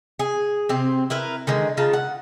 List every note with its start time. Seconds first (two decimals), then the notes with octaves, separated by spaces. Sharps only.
0.19 G#4
0.69 C3 C4
1.10 E4 A#4 B4
1.47 D3 D#3 G#3
1.77 C#3 D#4 F4 A5
1.93 F#5